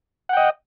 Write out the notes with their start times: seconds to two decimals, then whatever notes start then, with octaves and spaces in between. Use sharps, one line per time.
0.29 F#5
0.33 G5
0.37 D#5